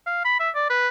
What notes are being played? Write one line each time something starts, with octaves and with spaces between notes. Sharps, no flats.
F5
B5
E5
D5
B4